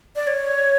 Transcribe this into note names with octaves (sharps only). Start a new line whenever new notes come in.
D5
C#5